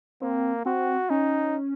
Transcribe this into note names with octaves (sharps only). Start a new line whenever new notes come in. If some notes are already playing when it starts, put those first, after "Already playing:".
A#3 C4
C4 F#4
C#4 D#4